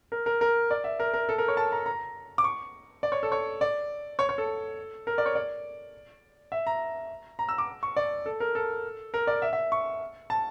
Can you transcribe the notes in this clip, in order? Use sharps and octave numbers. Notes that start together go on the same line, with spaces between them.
A#4
A#4
A#4
D5
E5
A#4
A#4
A4
A#4
C#5
A5
A#5
A#5
D6
C#6
D5
C#5
A4
C#5
D5
C#5
C#5
A4
A#4
D5
C#5
D5
E5
A#5
A#5
E6
D6
C#6
D5
A4
A#4
A4
A#4
D5
E5
E5
C#6
A5